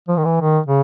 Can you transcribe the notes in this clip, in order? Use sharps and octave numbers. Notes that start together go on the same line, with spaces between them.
F3
D#3
E3
D#3
C#3